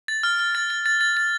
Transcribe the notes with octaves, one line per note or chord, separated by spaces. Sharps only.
A6
F6
F6
A6
A6
A6
A6
A6